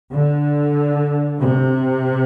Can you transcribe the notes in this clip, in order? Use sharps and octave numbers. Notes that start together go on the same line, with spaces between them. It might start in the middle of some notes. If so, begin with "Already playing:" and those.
D3
C3